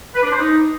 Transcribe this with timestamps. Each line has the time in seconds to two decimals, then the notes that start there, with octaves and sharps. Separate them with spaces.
0.15 B4
0.23 D4
0.31 C5
0.39 D#4